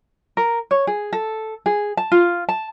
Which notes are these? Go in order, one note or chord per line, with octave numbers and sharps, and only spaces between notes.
A#4
C#5
G#4
A4
G#4
A5
F4
A5